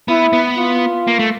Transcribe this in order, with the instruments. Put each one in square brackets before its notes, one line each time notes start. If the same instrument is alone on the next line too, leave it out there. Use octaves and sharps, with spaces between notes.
[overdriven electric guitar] B3 [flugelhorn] E4
[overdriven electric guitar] B3
[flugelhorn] F4
[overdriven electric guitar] A#3
A3